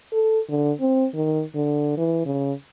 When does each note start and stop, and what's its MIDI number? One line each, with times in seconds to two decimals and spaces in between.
0.12 0.39 69
0.49 0.72 50
0.80 1.06 60
1.14 1.42 51
1.55 1.93 50
1.97 2.21 52
2.25 2.52 49